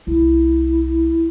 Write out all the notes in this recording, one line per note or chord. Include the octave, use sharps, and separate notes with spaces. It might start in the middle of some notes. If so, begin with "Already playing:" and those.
C2 E4